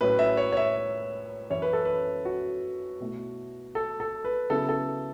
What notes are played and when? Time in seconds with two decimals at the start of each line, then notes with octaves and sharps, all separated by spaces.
0.01 A2 F#3 C#4 B4
0.19 E5
0.37 C#5
0.52 C#5
0.57 E5
1.50 F#2 E3 C#4 E4 C#5
1.62 B4
1.73 A4
1.85 B4
2.25 F#4
3.00 B2 A3 E4
3.75 A4
4.00 A4
4.24 B4
4.50 C#3 F#3 B3 E4 A4
4.69 A4